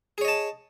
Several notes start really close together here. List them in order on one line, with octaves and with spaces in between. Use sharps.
G#4 C#5 D#5 A5